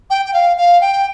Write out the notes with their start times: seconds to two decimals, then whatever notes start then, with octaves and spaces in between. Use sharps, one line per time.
0.10 G5
0.26 G5
0.33 F5
0.57 F5
0.81 G5